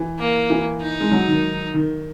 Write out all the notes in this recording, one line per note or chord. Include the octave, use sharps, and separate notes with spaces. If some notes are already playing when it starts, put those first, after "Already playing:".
Already playing: E3
A#3
E3
D#4
G#3
F#3
D#3
D#3